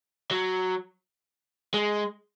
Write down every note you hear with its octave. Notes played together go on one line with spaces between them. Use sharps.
F#3
G#3